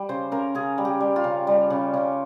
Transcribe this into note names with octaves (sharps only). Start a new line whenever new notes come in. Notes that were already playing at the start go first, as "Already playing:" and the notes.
Already playing: G3
C#3 C5
C#3 A#4
C#3 G#4
G3
G4
G3
F4
C#3
G3
C#3
C#3